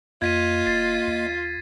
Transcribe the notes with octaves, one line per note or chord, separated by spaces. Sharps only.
F2 A#3 F4 D#5 G#6 B6 D#7
F#1 A6 C7
D#2